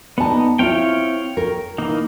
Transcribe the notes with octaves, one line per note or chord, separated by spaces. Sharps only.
B3 D#4 D5 A5
C4 E4 F4 C#5 F5 G5
A#4
E3 A#3 D#4